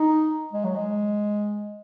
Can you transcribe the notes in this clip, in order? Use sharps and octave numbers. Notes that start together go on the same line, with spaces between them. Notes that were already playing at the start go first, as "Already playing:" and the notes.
Already playing: D#4
G#3
F#3
G#3